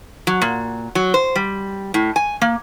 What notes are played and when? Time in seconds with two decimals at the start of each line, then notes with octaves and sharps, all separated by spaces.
0.27 F#3
0.42 A#2
0.95 F#3
1.14 C5
1.36 G3
1.94 A2
2.16 G#5
2.42 A#3